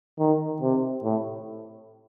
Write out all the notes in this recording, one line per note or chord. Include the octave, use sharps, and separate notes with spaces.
D#3
C3
A2